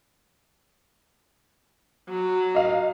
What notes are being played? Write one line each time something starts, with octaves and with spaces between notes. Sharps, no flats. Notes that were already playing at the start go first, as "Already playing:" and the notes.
F#3
D#5 F5